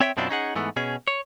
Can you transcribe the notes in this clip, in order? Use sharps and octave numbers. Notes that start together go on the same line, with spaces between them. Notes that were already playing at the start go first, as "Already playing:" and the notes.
C4 C#5 E5 G5
F#2 B2 C4 D4 E4 F4
C#4 D#4 G#4 F#5
G#2 E3 A3 B3
B2 C#4 G#4
C#5